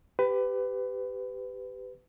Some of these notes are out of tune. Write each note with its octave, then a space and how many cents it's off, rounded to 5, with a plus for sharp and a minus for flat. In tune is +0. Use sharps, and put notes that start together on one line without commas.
G4 +0 B4 +25